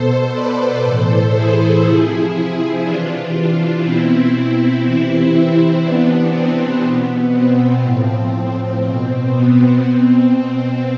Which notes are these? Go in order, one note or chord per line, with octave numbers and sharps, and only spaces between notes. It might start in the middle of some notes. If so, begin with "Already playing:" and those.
Already playing: B2 A4 C5
B4 D5
A2 E3 A4 C5
E4 G#4
C3 F3
C3 E3 D4 F4
B2 C4 E4
C3 E3
C4 E4
C3 E3 B3 D4
C4
B2 B3
C4
A2 F3
B2
B3
B2 C4
C4